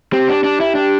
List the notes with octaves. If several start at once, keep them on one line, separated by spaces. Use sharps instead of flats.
C4 G4
D4
D4
E4
D4